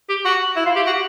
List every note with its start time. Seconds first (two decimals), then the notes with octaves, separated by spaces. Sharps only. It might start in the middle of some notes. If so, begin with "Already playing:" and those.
0.09 G4
0.25 F#4
0.56 E4
0.66 F4
0.76 G4
0.86 F#4